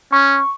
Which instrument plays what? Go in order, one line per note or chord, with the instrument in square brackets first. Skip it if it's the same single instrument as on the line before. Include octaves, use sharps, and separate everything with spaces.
[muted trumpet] C#4 [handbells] C#6